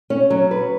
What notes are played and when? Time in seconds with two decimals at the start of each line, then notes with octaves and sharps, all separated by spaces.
0.10 C#4
0.30 F#3
0.51 B4